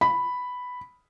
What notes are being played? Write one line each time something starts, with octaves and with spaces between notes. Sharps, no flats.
B5